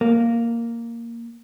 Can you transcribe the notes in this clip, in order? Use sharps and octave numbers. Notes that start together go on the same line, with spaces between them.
A#3